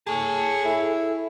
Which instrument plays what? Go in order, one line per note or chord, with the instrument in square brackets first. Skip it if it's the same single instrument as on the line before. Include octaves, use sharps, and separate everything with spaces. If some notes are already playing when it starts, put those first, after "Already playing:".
[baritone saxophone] G#4 [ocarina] A4 [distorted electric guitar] C#5 A5
[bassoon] E4